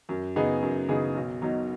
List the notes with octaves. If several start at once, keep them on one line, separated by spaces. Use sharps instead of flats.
F#2
C#3 B3 D#4 G#4
F#2
C#3 B3 D#4 G#4
B1
B2 F#3 D#4